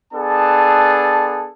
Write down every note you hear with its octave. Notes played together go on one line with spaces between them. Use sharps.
B3 D4 G#4 A4 A5